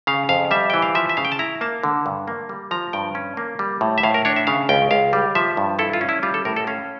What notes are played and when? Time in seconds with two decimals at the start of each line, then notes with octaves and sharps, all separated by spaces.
0.07 C#3 F5
0.29 F2 F5
0.51 G3 E5
0.70 E3 G5
0.82 F5
0.95 F3 E5
1.09 E5
1.17 C#3 F5
1.25 G5
1.32 A5
1.39 E4 A#5
1.61 A#3 A5
1.83 D3
2.06 G2
2.27 A#3
2.49 G3
2.71 F3 A#5
2.93 G2 G5
3.15 C#4
3.37 A#3
3.59 G3
3.81 A2
3.98 E5
4.03 A2 F5
4.14 A#4
4.25 D4 C#5
4.36 E5
4.47 C#3 F5
4.69 C#2 G5
4.91 C#2 F5
5.13 G3
5.35 F3 E5
5.57 G2
5.79 E4 A4
5.93 F4
6.01 C#4
6.09 E4
6.23 G3 F4
6.34 A4
6.45 A2 A#4
6.56 A4
6.67 C#4 F5